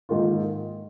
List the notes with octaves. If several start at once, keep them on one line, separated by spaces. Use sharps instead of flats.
G#2 D#3 A#3 F4